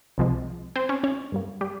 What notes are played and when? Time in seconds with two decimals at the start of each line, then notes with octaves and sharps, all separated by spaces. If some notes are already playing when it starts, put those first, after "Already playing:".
0.18 C2 C3 F3 G#3
0.76 C4 C5
0.89 C#4 C#5
1.03 C#4 C#5
1.32 G2 G3 A#3
1.61 G3 G4